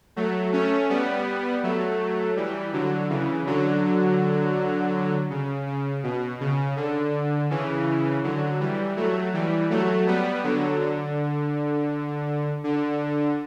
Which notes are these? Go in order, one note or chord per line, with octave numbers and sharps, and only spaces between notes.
F#3 A3
A3 C#4
G3 B3
F#3 A3
E3 G3
D3 F#3
C#3 E3
D3 F#3
C#3
C#3
B2
C#3
D3
C#3 E3
D3 F#3
E3 G3
F#3 A3
E3 G3
F#3 A3
G3 B3
D3 F#3
D3
D3